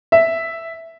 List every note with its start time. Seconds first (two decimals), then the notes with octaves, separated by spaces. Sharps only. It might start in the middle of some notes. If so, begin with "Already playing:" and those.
0.12 E5